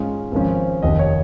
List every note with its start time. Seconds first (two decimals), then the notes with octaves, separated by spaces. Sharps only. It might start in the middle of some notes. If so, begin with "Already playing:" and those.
Already playing: G#2 G#3 C#4 F4
0.32 G#1 G#2 F3 C#4
0.82 F1 D#2 D#3 D#5
0.99 C#5